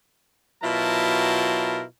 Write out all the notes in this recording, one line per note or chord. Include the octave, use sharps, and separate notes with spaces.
B2 F#3 E4 F4 A#4 A5